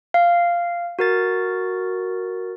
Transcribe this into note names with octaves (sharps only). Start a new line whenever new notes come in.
F5
F#4 A#4 A6